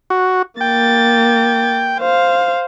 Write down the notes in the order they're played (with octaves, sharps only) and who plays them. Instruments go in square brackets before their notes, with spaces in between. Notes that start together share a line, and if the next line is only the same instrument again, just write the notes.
[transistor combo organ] F#4
[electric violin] A#3 A6 [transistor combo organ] G5
[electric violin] C5 F5